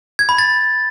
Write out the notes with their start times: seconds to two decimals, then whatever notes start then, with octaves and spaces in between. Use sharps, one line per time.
0.19 G#6
0.29 B5
0.38 A6